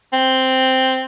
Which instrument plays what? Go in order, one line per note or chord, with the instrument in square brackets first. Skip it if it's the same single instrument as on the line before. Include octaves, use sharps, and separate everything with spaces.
[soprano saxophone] C4